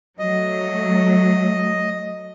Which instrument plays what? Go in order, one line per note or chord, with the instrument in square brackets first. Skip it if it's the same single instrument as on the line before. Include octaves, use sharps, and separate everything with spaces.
[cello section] F#3 A3 [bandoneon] D#5